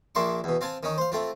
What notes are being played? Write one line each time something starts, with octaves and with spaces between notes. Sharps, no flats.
A#1 A#3 D4 E5 C6 C#6
E2 B2
C4 F5 G#5 A5
D#3 C#4 D#4
C5 F5
A3 C4 F4